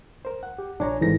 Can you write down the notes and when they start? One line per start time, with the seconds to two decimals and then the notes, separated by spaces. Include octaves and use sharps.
0.25 A#4 C5
0.43 F#5
0.58 G4
0.80 A#1 D4 C#5 G#5 A#5
1.01 G#1 G#2 E3 D#4 A4 A#6